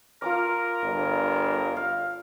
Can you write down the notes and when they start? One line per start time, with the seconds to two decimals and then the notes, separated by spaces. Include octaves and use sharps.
0.22 F4 A#4 A#5 D6
0.84 G1
1.77 F5